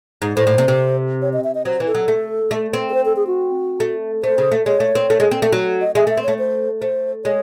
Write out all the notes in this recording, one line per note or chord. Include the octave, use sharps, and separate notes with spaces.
G#2
A2 C5
A2
C3
C3
C#5
D#5
E5
D#5
F#3 C5
E3
A4
F#3
A3
A3
C4
A4
C5
A4
G#4
F#4
A3
A3 C5
C#3
A3
G#3 C#5
A3
C4
A3
G#3
C4
A3
F#3
D#5
G#3 E5
A3
E5
C4
A3 C#5
C5
A3 C5
G#3 C#5